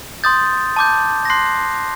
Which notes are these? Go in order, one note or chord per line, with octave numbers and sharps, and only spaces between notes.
C6 D#6 G6 A6
A5 D6 G6
A#6
C6 F#6 C7